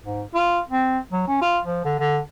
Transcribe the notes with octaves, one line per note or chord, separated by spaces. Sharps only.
G#2
F4
C4
F#3
C#4
F4
F3
D3
D3